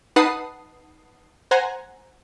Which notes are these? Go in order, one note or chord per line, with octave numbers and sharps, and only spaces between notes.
D#4 B4 F#5 A5 D#6 C7
C5 F#5 G#5 A#5